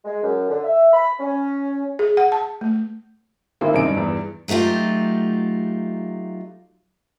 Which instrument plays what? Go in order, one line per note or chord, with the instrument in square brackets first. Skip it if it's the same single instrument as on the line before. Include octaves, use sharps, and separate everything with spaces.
[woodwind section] G#3
F#2
D3
E5
B5
C#4
[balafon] G#4
F#5
A5
A3
[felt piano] G#1 E4 [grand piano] A#3
[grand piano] F#2 C3 D7 [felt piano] D#4
[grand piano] G2
[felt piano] E2
[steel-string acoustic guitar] F#3 A3 D#4 F4 G4